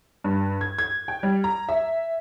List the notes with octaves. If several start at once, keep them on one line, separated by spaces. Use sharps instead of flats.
G2
G#6
G#6
G5
G3
A#5
E5